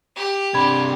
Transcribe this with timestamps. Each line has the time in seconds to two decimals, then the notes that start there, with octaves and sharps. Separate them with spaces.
0.16 G4
0.54 C3 D4 B5 G#6